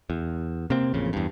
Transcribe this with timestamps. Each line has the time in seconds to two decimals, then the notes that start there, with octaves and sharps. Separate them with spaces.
0.10 E2
0.70 C3 A#3 C4
0.94 A1 F2 A#2 C#3
1.13 E2 G2